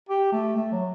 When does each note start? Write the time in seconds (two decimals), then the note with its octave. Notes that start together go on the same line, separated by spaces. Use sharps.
0.09 G4
0.32 A3
0.56 A3
0.72 F#3